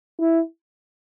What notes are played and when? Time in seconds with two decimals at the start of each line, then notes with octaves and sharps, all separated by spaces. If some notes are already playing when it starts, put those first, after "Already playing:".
0.20 E4